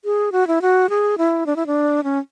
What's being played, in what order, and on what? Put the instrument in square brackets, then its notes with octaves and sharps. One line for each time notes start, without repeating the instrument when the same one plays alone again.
[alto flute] G#4
F#4
E4
F#4
G#4
E4
D4
E4
D4
C#4